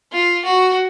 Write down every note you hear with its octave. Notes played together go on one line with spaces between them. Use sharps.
F4
F#4